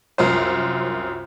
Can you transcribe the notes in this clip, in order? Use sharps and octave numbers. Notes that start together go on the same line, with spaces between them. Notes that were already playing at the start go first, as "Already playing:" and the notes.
C2 F#2 F4 C5